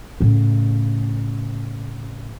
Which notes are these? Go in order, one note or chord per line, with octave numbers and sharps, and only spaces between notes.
A2 C#3